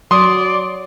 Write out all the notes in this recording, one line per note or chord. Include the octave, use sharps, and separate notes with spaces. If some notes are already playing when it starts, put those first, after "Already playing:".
F#3 D5 C6 D#6